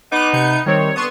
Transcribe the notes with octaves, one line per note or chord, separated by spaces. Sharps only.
B3 D#4 D6 F#6
C3 G6 C#7
D#3 G3 C4 C#5
D3 B3 C6 C#6 D#6